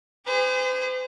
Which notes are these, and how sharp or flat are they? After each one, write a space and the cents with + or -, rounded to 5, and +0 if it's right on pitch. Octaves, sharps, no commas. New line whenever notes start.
G#4 -35 C5 -40